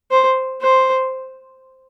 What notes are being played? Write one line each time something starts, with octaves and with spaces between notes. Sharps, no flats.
C5
C5